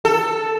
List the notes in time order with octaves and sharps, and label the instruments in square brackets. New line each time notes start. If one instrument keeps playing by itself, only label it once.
[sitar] A4